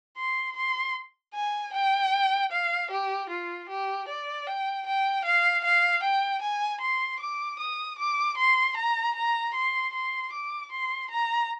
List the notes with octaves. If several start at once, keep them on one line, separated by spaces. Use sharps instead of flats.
C6
C6
G#5
G5
F5
G4
F4
G4
D5
G5
G5
F5
F5
G5
G#5
C6
D6
D#6
D6
C6
A#5
A#5
C6
C6
D6
C6
A#5